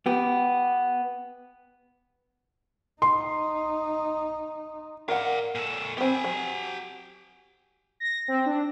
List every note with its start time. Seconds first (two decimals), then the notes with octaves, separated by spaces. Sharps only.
0.06 B3 G4
3.02 D#4 C6
5.09 A#4 D5 F5 F#5
5.55 A#2 A4
5.97 B3 C4 G4 G#5
6.24 F#3
8.00 A#6
8.28 C4
8.46 D4